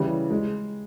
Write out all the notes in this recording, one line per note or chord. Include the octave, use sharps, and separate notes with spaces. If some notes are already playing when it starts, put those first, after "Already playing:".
Already playing: C#3 E3 G3
G#3